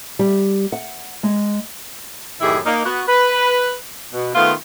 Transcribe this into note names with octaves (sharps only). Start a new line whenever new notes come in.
G3
F#5
G#3
F#2 A2 D#3 E4 G4 G#4
A#3 D#4
B3 F#4
B4
B2
D#3 A3 B3 F4